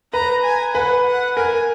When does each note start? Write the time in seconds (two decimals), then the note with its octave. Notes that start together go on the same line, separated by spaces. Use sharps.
0.13 B4 A#5
0.44 G#5
0.75 B4 F#5
1.06 F#5
1.37 A#4 G#5